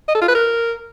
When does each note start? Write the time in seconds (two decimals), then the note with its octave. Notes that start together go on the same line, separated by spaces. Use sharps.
0.08 D#5
0.15 A4
0.22 F4
0.28 B4
0.35 A#4